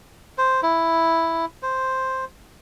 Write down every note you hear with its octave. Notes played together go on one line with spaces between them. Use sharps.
C5
E4
C5